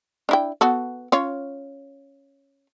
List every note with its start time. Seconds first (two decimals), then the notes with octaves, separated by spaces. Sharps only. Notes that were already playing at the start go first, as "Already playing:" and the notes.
0.29 D4 E4 G5
0.61 B3 F#4 A4
1.12 C#4 F4 C#5